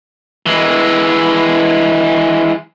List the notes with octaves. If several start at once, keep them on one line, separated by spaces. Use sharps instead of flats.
E3 G#3